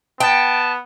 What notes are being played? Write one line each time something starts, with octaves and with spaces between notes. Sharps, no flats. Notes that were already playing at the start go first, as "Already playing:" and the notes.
B3 G5 A5